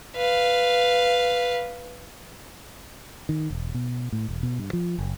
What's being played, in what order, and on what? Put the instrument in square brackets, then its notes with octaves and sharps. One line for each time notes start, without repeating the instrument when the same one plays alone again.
[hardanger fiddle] B4 F5
[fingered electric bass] D#3
E1
B2
A2
E1
B2
G2
F3
F#1